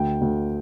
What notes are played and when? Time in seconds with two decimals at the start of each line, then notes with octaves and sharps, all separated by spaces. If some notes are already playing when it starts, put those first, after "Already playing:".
Already playing: D2 G5
0.21 D2